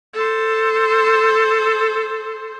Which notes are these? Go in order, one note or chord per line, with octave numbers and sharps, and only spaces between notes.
A4 C5